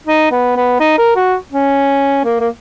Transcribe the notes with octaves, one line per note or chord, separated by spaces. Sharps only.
D#4
B3
B3
D#4
A#4
F#4
C#4
A#3
A#3